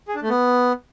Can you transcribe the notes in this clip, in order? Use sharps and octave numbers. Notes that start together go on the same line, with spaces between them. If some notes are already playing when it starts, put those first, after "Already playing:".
G#4
D4
A3
B3